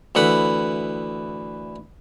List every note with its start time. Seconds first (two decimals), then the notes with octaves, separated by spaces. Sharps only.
0.15 D2 E3 F#5 B5